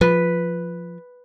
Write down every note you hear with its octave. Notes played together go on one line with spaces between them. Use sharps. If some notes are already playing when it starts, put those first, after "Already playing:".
F3 B4